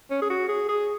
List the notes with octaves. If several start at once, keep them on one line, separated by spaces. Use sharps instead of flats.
C#4
G#4
F#4
G#4
G#4